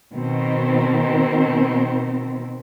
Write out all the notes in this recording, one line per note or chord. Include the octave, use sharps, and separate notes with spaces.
B2 D#3 C4